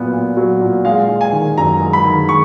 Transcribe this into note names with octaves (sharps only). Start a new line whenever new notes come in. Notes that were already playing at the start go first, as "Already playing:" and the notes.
Already playing: A#2 F#3 B3
A#2
F#3
A#2
G#3 F5
G#3
G#5
D#3
F#2 A#5
G#3
B5
D#3
G#3 C#6